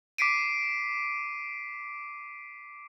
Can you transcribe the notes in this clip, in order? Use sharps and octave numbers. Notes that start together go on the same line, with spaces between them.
D6 B6 C7 D7 D#7